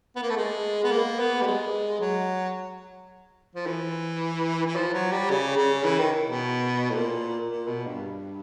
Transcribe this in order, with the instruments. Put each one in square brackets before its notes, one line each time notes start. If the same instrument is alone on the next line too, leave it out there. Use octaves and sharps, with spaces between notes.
[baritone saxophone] B3
A#3
A3
G#3
B3
A#3
B3
G3
G#3
F#3
F3
E3
E3
F3
F#3
G3
C#3
C#3
E3
D#3
B2
A2
A#2
A#2
B2
G2